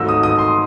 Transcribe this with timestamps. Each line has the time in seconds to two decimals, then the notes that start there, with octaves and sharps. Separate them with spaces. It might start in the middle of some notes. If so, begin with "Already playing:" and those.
Already playing: G#1 G#2 F#3 A3 D#4 E6
0.09 D#6
0.23 D#6
0.38 C6